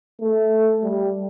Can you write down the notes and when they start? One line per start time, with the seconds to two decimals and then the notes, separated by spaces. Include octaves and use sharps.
0.20 A3
0.83 G3